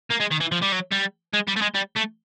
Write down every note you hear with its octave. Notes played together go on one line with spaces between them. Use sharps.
A#3
G#3
D#3
E3
F3
G3
F#3
G3
G#3
G3
A3
G#3
G3
A3